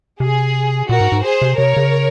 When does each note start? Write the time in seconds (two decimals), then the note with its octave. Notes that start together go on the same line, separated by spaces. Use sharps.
0.20 C3 G#4
0.89 A#2 F#4 A#4
1.01 G#2
1.12 G#2
1.24 G#4 C5
1.42 C3
1.58 C3 A#4 C#5
1.77 C#3